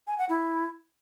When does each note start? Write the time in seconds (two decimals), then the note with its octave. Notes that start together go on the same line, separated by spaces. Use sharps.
0.07 G#5
0.18 F#5
0.29 E4